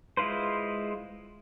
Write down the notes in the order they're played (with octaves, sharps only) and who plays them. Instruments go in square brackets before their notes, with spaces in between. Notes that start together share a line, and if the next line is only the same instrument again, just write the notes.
[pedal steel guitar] G#3 E4 F4 B4 C5